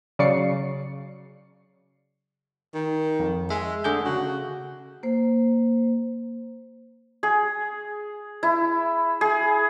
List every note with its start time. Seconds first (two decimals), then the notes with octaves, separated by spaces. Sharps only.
0.19 C#3 F#3 D5 C#6 C7 C#7
2.75 D#3
3.20 F2
3.50 G#3 E5
3.84 D3 A3 G#4 G6
4.05 C#3 F#4
5.03 A#3 C5
7.23 G#4
8.43 E4
9.21 G#4